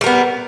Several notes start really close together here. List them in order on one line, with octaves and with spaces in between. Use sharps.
G3 A#4 B3